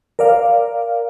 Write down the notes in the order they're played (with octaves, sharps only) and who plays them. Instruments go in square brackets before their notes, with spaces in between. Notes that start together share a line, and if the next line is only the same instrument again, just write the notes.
[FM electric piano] A#4 D5 F5